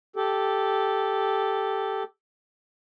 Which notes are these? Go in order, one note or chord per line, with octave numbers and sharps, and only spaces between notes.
G4 A4